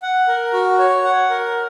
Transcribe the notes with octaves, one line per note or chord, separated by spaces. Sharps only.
F#5
A#4
F#4
C#5
F#5
A#4